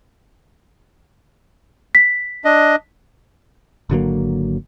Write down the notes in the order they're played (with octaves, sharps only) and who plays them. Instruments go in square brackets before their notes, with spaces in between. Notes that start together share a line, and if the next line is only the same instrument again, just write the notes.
[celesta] B6
[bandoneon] D4 D#5
[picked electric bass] G#1 D3 F#3 A#3